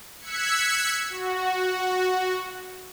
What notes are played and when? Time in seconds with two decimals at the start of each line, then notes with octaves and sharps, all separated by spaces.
0.20 E6 F#6 G#6 B6 C#7
1.10 F#4